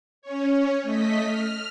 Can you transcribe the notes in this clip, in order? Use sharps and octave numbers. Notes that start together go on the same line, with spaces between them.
C#4 C#5
A3 D#5 B6
F6